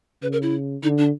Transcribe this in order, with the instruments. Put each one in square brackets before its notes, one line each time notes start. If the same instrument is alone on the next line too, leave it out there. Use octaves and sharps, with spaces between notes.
[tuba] C#3 [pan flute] B4
[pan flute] A#4
E4
[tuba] D3 [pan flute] D#4
[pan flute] D4